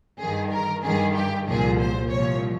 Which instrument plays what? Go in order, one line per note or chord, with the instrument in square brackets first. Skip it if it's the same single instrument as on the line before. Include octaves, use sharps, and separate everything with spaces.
[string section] G2 D#3 G#4
A#4
G2 D#3 G#4
G4
C2 A#2 F3 G#4
C5
C2 A#2 F3 C#5